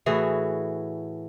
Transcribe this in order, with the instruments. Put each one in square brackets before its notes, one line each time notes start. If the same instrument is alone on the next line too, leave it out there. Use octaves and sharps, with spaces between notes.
[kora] A2 E3 F#4 G#4